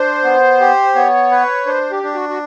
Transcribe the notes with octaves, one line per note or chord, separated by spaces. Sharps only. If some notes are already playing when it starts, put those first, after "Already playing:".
Already playing: D4 C5
B3
G4
B3 C#5
B4
D4 C5
G4
D4
F#4
F#4